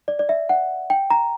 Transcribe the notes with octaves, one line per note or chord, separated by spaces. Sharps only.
D5
D5
E5
F#5
G5
A#5